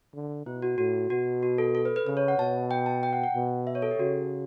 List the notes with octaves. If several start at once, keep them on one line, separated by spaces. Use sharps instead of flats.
D3
B2 E4
F#4
A2 F#4
B2 F#4
F#4
A4
A4
B4
B4
C#3 B4
C#5
F#5
B2 A5
G5
A5
G5
F#5
F#5
B2
E5
C#5
A4
G4
C#3 F#4